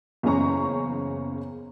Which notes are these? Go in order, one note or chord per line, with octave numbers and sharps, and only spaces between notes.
F#1 E2 C#3 C#4 A#5 C#6